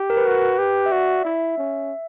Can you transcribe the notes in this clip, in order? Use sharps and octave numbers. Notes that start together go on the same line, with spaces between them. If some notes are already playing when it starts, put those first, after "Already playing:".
Already playing: G4
A#4
B4
F#4
G4
E5
F#4 D5
E4 E5
C#4